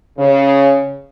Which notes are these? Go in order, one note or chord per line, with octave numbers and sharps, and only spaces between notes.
C#3